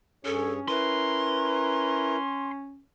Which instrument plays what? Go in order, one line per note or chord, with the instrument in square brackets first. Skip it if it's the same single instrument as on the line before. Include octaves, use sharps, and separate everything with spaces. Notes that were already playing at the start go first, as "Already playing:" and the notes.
[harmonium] G2 G#4 C#5 [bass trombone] C#4 [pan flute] A4
[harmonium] E4 A#4 A#5 [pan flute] B4 [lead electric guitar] C6